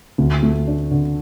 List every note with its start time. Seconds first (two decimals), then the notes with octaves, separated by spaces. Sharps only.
0.18 D2
0.43 A3
0.68 D4
0.91 D3